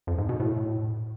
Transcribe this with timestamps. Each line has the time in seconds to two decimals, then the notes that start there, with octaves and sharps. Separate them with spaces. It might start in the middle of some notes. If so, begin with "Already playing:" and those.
0.07 F2
0.18 G#2
0.29 B2
0.40 A2